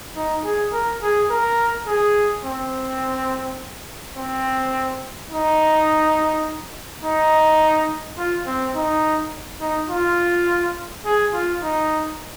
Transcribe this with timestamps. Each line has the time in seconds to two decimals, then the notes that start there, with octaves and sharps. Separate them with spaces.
0.16 D#4
0.44 G#4
0.72 A#4
1.02 G#4
1.30 A#4
1.87 G#4
2.44 C4
4.17 C4
5.31 D#4
7.03 D#4
8.18 F4
8.47 C4
8.75 D#4
9.61 D#4
9.89 F4
11.05 G#4
11.33 F4
11.63 D#4